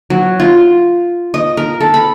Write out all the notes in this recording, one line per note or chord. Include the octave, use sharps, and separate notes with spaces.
F#3
F4
D#5
A#4
A4
B5